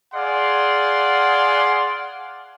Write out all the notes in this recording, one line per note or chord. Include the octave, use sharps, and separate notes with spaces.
G#4 D5 F5 F#5 C6